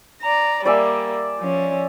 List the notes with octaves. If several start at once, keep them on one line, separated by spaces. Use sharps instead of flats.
D5 A#5
G3 A#3 D5 E5 G#5
F3 C#4